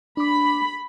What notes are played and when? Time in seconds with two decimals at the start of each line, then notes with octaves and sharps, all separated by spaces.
0.17 D4 B5 D6